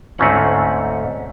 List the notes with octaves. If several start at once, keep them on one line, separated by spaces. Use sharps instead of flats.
D2 G#2 A3 C4 C#4 F#5